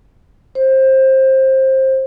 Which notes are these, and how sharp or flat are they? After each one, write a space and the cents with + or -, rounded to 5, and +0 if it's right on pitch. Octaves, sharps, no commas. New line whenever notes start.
C5 +20